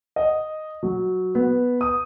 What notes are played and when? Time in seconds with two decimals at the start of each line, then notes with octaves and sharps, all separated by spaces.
0.16 D#5
0.83 F#3
1.35 B3
1.81 D#6